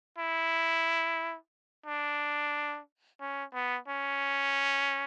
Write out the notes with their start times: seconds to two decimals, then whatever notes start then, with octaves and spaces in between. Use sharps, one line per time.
0.18 E4
1.86 D4
3.20 C#4
3.54 B3
3.88 C#4